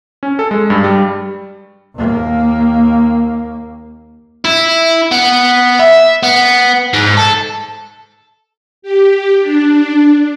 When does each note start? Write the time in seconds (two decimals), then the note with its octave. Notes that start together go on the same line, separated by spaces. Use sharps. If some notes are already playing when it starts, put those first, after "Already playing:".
0.23 C#4
0.39 A4
0.51 G#3
0.70 G2
0.84 G3
1.96 D#2 A#3
4.45 E4
5.11 B3
5.79 E5
6.23 B3
6.94 G#2
7.17 A4
8.82 G4
9.40 D4